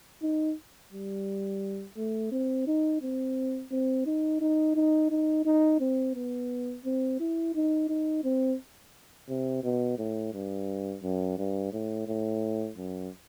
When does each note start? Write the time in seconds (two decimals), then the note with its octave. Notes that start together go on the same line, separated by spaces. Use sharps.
0.23 D#4
0.92 G3
1.97 A3
2.32 C4
2.67 D#4
3.02 C4
3.71 C4
4.06 D#4
4.41 D#4
4.76 D#4
5.10 D#4
5.45 D#4
5.80 C4
6.15 B3
6.85 C4
7.20 E4
7.55 D#4
7.89 D#4
8.24 C4
9.29 C3
9.63 B2
9.98 A2
10.33 G2
11.03 F#2
11.38 G2
11.73 A2
12.08 A2
12.77 F#2